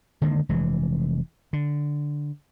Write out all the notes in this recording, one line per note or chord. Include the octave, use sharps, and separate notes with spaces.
D3 D#3 G#3 A#3
F1 E3 G#3
D3